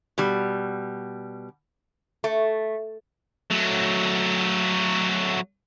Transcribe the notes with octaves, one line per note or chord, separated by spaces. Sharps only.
B2 G3
A3
F#3 A3